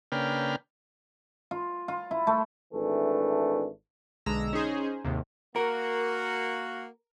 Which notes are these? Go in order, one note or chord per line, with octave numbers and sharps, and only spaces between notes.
C#3 A#3 D4 B4 G5 F6
F4
F4
E4
A3
G#1 E3 A3 D4
B1 D3 G#3 A#5 E6 A#6
C#4 D#4 G#4 C5
D#2 G#2 C3
A#3 F#4 A#4